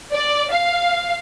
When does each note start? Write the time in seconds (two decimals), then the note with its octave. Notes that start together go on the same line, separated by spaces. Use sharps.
0.12 D5
0.51 F5